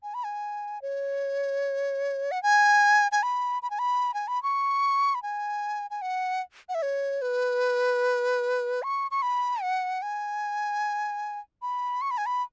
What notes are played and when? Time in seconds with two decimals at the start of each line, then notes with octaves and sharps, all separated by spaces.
0.03 G#5
0.14 B5
0.25 G#5
0.82 C#5
2.31 F#5
2.43 G#5
3.12 G#5
3.23 B5
3.63 B5
3.71 G#5
3.79 B5
4.14 G#5
4.28 B5
4.43 C#6
5.15 B5
5.23 G#5
5.91 G#5
6.02 F#5
6.69 F#5
6.75 E5
6.82 C#5
7.22 B4
8.83 C#6
9.11 C#6
9.22 B5
9.62 F#5
10.02 G#5
11.62 B5
12.02 C#6
12.11 B5
12.18 G#5
12.26 B5